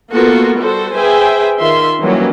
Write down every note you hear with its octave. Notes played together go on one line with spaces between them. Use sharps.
A#3 B3 F4 F#4 A4 A#4
G3 F#4 A4 C5
G#4 B4 C5 E5 G5 G#5
D#3 F4 E5 C6
D#3 E3 F#3 G3 A#3 C#4